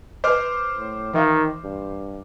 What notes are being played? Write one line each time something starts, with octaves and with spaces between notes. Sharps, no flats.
B4 C5 D#5 D6 F6
A2
D#3 E3 E5 F5
G2